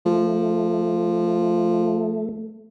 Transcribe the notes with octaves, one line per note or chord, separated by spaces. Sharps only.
F3 A3